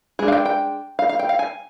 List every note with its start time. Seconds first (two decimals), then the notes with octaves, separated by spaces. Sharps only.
0.19 G#3 D4 G#4
0.28 F5
0.32 G5
0.45 G5
0.99 F5
1.09 F5
1.19 G5
1.29 F5
1.39 G#5